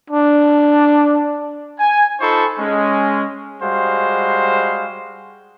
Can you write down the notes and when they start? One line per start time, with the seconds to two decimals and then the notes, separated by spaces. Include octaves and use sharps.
0.10 D4
1.79 G#5
2.20 D#4 F4 A4 C5 B5 C#6
2.59 G#3 C#4
3.62 G3 G#3 F#4 C5 F5